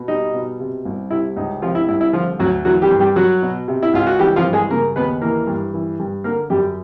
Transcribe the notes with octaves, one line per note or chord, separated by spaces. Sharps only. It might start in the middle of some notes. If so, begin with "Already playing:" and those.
Already playing: B2
G3 D#4
B2
C3
C2
C3 E4
C#2 D#4
C3 F3 F4
E4
C2 E4
E4
D3 F3 F4
D2 F#3 F#4
E3 F#3 F#4
G3 G4
G2
G3 G4
F#3 F#4
B2
C3
E4
C#2 F4
F#4
E3 G3 G4
F3 F4
G2
G#3 G#4
C#3 A#3 A#4
D#2 B3 B4
E3 A#3 A#4
G2
E3
G2
D3 A#3 A#4
F#2 G3 G4